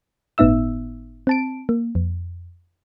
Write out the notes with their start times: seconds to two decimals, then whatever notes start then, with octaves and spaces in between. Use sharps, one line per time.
0.38 G1 A2 B3 D#4 E5 E6
1.27 C4 A5 D7
1.69 A#3
1.95 F2